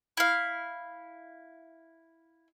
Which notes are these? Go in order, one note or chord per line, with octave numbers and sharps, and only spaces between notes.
E4 F5